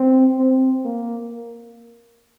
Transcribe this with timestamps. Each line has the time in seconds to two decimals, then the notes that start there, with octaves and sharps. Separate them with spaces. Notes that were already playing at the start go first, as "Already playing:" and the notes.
Already playing: C4
0.38 C4
0.85 A#3